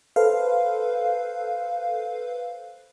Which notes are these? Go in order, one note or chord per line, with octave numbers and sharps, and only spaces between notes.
A4 B4 C5 F5